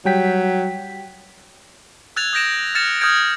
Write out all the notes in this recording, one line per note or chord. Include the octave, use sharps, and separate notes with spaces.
F#3 G3 G5 B6
E6 F#6 G#6 A6 F7
D#6 G6 A#6 D7 E7
F6 G#6 A6 C#7 E7
D#6 F6 G6 G#6 D7